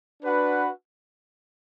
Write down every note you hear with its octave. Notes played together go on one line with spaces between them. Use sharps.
D4 F#4 B4 F#5